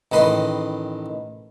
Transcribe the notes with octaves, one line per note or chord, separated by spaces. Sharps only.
A1 D#3 B4 D#5 C6